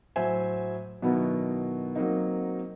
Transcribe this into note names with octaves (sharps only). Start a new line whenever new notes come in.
A2 F#3 C5 E5 G#5
B2 D#3 F#3 B3 E4
F#3 A#3 C4 D#4